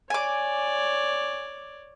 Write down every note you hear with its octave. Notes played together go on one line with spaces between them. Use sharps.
C#5 D5 G#5 D6